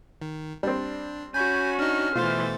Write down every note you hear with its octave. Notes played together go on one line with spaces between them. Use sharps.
D#3
G3 C4 D4
C#4 F#4 G#5 B5 G6
D4 D#4 F6
B2 E3 A3 F4 C5 A6